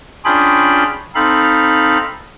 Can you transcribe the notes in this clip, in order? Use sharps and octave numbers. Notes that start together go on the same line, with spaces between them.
C#4 D4 F4 G#4 G5 B5
C4 D#4 A4 F5 B5